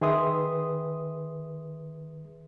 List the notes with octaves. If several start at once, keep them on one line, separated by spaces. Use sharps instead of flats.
D#3 G#4 B4 E5 C6 D#6